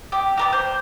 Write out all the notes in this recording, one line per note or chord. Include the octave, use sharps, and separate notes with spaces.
G4
G4 A#4 D5
C5